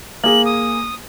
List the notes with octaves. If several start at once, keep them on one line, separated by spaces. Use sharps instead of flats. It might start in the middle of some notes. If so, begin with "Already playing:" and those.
A#3 G#4 F#7
D#6